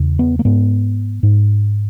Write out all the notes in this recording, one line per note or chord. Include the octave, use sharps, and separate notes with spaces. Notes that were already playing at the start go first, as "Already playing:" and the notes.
Already playing: E2 C#3
B3
A#3
G#2 B3
G#2